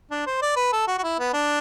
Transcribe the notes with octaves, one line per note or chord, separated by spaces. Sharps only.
D4
C5
D5
B4
A4
F#4
F#4
E4
B3
D4